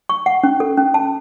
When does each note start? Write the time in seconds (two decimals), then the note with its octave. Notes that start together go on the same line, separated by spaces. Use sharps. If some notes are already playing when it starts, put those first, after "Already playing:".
0.09 C#6
0.26 F#5
0.43 C#4
0.60 A4
0.77 C#4
0.94 A5